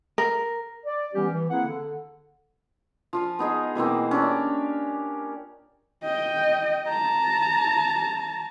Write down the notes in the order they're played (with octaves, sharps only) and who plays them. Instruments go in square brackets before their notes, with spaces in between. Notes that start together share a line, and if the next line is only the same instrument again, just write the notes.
[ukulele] A#4
[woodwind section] D5
E3 G3 B3 C#4 G4
E3
A#3 C4 E4 G#4 F#5
D3
[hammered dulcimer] F3 F4 G#5
B3 D#4 G#4 D#5
B2 E3 A#3 C4
C#4 D4 G4 D5
[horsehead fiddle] D#5 G5
A5 A#5